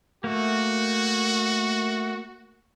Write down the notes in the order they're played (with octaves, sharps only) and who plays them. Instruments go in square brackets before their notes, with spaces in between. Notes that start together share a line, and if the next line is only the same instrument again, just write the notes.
[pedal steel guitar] A3 A#3 [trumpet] F#4